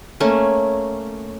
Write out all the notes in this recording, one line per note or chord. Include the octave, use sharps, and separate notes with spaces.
A3 A#3 C#4